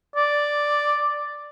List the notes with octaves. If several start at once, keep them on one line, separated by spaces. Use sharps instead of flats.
D5